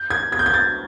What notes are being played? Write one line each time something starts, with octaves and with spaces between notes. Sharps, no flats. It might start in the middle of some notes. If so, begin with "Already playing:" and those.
Already playing: G6
G#6
G#6
G6
G#6
A6